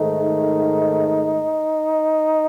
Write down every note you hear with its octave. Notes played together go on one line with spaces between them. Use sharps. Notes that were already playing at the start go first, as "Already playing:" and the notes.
Already playing: G#2 D#3 A3 D#4